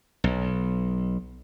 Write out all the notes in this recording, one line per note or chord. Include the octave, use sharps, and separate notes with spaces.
B1